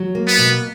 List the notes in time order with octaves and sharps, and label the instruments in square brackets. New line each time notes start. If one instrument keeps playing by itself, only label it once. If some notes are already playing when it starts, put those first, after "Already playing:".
Already playing: [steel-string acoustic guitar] F#3
A#3
[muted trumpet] B3
[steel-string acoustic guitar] B2